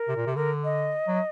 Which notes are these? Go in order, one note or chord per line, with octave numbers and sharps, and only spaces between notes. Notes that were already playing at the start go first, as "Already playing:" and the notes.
Already playing: A#4
C3
A#2
C3
D3 A#4
D#5
F#3